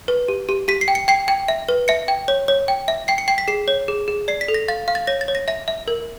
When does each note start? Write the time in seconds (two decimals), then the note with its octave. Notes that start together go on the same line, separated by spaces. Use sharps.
0.08 B4
0.28 G4
0.49 G4
0.68 G4 B6
0.81 C7
0.88 G5
0.95 C#7
1.08 G5 C7
1.28 G5
1.48 E5
1.69 B4
1.88 E5 C#7
2.08 G5
2.28 C#5
2.48 C#5
2.68 G5
2.88 E5
3.08 G5 C7
3.18 C#7
3.28 G5 C7
3.38 B6
3.48 G#4 C7
3.68 C#5
3.88 G#4
4.08 G#4
4.28 D5 C7
4.41 B6
4.48 A4
4.54 A#6
4.68 F5 A6
4.88 F5
4.95 A6
5.07 C#5 A#6
5.21 A6
5.28 C#5
5.35 A#6
5.48 E5 A#6
5.68 E5
5.88 A#4